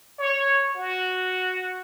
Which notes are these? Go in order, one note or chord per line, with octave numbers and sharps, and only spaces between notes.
C#5
F#4